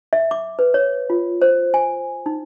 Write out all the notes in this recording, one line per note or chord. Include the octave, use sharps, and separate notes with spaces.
E5
D6
B4
C#5
F4
C5
G#5
D#4